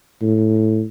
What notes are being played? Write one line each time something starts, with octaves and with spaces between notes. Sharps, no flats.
A2